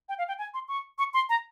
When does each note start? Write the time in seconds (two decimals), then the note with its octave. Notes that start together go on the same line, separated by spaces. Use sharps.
0.09 G5
0.18 F5
0.28 G5
0.38 G#5
0.54 C6
0.68 C#6
0.99 C#6
1.14 C6
1.29 A#5